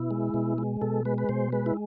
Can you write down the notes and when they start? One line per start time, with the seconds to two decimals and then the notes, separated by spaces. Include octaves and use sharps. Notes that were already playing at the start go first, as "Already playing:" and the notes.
Already playing: B2 E4
0.11 G#3
0.34 B2
0.58 G#3
0.81 B2 A4
1.05 G#3 B4
1.18 B4
1.29 B2 C5
1.52 G#3 B4
1.66 E4